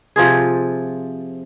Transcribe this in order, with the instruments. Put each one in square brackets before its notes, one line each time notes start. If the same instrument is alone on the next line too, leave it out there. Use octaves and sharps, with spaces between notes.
[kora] C3 F3 F4 G#4